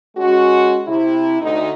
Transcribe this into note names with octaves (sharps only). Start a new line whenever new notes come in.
G#3 C#4 F#4
C3 E4
D2 D#4